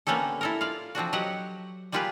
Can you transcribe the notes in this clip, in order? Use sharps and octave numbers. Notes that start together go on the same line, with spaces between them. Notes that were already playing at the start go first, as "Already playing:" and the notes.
D3 A#3 B3 C#4 G4 A4
E4 A4 A#4
F4 D5 F5
F3 C4 D4 F#4
F#3 G4 C#5 D#5 F#5
G3 A#3 F4 G4 G#4 B4